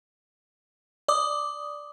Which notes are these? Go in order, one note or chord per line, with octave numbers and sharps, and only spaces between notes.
D5 D6 D#6